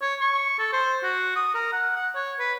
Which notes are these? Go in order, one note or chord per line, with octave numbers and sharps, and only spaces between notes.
C#5
C#6
A4
C5
F#4
D#6
A#4
F#5
F#5
C#5
B4